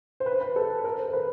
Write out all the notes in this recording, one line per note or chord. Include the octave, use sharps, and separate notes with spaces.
C5
B4
B4
A4
A#4
C5
A#4
B4